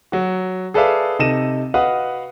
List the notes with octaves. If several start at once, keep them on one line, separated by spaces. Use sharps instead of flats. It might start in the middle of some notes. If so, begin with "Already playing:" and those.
F#3 F#4
G#4 A4 B4 D5 E5 F5
C3 D#4 A4 A#6 D#7 E7
F#4 B4 D#5 F5 F#5 D#6